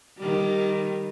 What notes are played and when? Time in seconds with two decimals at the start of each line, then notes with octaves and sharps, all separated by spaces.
0.18 D#3 G3